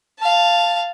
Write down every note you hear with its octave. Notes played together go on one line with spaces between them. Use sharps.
F5 A5